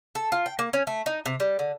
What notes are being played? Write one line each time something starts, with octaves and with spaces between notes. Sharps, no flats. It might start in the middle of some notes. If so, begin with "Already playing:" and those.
A4
F4
G5
A#3
C#4
A3
D#4
C3
G3
D3